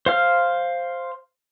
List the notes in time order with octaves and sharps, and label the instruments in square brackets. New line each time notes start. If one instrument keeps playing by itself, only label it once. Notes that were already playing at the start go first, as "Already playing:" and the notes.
[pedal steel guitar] C5 F5 F6